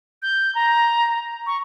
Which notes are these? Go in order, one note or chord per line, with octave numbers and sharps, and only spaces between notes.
G6
A#5
C#6